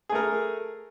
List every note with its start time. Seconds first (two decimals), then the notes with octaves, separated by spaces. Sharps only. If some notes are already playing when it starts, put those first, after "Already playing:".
0.09 G#4
0.12 A3
0.15 A#4